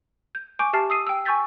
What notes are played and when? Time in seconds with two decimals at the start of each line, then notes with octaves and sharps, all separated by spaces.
0.35 G6
0.59 G#5 C#6 D6 G6 D7
0.73 G4 E5 A5 F6 A6 C7
0.90 D#6 E6 C7 D#7
1.07 G5 E6
1.25 G#5 C#6 E6 G6 A6 B6